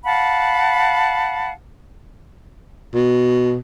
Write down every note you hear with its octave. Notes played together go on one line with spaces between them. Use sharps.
F5 F#5 A5 B5
B2